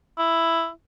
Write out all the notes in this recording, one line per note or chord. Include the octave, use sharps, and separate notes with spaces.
E4